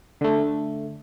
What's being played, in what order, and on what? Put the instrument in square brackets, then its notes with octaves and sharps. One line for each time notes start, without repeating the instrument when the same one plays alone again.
[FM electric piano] D3 A3